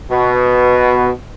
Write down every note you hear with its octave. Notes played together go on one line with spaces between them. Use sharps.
B2